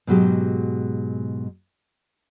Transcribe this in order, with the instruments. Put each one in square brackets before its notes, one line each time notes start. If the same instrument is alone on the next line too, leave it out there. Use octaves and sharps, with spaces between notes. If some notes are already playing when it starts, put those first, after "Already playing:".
[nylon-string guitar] G#2 B2 F#3 G#3 G4